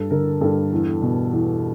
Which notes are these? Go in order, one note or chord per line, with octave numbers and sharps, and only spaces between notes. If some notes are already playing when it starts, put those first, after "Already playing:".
Already playing: G2 A4
D3 A#4
G2 A4
E2
B2
E2